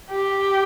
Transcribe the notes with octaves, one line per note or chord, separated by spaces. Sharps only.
G4